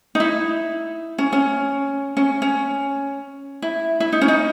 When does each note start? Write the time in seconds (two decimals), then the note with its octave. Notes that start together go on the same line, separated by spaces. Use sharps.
0.15 D#4
0.20 E4
1.18 C#4
1.33 C#4
2.17 C#4
2.42 C#4
3.62 E4
4.00 E4
4.12 D#4
4.21 C#4
4.28 D#4